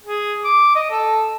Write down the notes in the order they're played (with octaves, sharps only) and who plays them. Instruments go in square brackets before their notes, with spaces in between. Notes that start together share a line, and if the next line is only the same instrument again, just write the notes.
[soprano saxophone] G#4
D6
D#5
A4